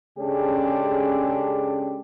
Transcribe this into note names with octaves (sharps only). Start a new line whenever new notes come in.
C#3 G#3 C#4 D4 G4 A4